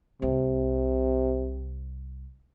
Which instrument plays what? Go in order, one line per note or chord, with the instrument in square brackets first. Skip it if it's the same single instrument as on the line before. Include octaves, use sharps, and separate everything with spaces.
[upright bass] C2 [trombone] C3